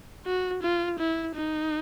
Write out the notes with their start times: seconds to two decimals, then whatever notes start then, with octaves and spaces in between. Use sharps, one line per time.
0.26 F#4
0.63 F4
0.99 E4
1.35 D#4